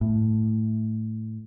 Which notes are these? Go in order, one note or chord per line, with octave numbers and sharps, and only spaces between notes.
A2